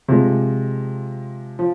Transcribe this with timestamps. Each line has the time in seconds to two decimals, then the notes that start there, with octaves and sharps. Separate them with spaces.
0.09 C3 F3 G#3
1.59 F3